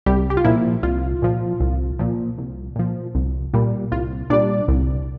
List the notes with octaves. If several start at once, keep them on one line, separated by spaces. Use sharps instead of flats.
C2 G3 G4
G4
F4
A#2 F3 E4
C2 F4
A#2 F3
C2
A#2 F3
C2
A#2 F3
C2
A#2 G3
C2 F4
A#2 G3 D4 D5
C2